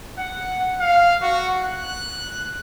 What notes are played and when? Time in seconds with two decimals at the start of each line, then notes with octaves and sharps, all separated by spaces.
0.18 F#5
0.80 F5
1.22 F#4
1.64 F#6